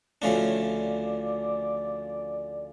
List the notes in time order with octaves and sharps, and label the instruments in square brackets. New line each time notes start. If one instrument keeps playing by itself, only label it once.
[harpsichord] D2 C#3 F3 A3 D4 [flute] C#5
[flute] D5